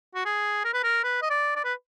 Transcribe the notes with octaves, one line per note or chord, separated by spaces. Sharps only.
F#4
G#4
A#4
B4
A#4
B4
D#5
D5
D5
B4